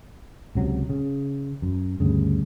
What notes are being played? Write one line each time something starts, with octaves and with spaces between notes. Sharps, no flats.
C#2 C3 F#3
C#3
F#2
D2 G2 C#3